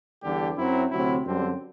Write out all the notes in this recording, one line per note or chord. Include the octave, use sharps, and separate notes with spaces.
E2 D3 G3 D4 G4
F#2 F#3 C4 E4
D2 C3 F#3 C4 E4
F#2 D3 G3 C4